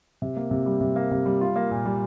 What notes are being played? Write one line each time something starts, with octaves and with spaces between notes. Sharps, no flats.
C3
A#3
C3
G3
C3
A#3
C3
G3
F4
A#3
A#2
G3